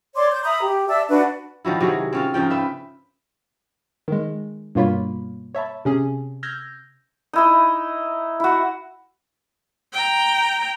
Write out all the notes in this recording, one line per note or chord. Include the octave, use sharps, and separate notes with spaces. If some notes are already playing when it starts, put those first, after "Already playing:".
C#5 D5 C6 D6
G6
E5 A#5 B5 D#6
G4
D5 E5 A5 E6
D4 F#4 B4
D#3 F3 F#3 E4
C3 F#3 F#4 G#4
C4 C#4 F4
G#2 C#3 F3 G5
B4 E5 G5
D#3 G#3
G2 B2 A#3 F4 C#5 B5
C#5 E5 A5 B5
C3 C#4 G#4
E6 F6 G6 G#6 A#6
D#4 E4 D#5
E4 F#4
G5 A#5